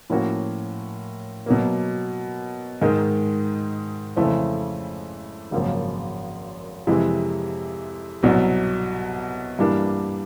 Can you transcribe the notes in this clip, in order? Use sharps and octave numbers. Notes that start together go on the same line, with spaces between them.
A2 F3 A#3 C#4 F#4
B2 F#3 A#3
G#2 D#3 G#3
F2 C#3 E3 A3 C4
G#1 F#2 C#3 F3 A#3
F2 C3 E3 G#3
C2 B2 F#3
G2 E3 G3 A#3 D4